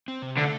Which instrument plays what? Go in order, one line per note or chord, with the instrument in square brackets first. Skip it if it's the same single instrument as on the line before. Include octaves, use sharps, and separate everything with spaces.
[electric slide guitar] C4
C3
[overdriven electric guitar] D3 [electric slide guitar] A3